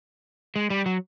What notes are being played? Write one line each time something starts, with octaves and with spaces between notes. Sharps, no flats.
G#3
G3
F#3